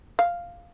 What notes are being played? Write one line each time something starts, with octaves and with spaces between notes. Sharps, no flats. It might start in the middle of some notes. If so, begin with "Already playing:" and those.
F5